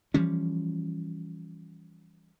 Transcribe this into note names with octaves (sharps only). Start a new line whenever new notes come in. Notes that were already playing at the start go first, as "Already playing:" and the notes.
E3 F3 G3 C#4